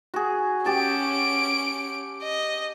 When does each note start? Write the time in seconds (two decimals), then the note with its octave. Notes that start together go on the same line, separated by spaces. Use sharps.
0.14 F#4 G#4
0.66 C#4 G4 A5 D7
2.23 D#5